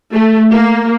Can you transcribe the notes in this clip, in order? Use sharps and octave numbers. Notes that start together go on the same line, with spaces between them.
A3
A#3